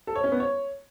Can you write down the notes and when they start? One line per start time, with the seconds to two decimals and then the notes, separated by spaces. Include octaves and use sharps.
0.07 A4
0.16 C#5
0.24 C#4
0.32 B3
0.40 C#5